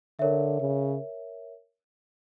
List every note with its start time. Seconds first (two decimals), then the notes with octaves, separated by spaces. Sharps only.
0.19 D3 A#4 C#5 E5
0.60 C#3